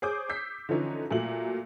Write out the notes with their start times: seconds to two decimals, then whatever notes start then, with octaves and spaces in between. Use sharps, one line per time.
0.02 G#4 C5 C#5 D6 D#6 G6
0.29 E6 G6 B6 C7
0.69 D3 E3 F3 C#4 D#4
1.10 A#2 F#3 A3 F#7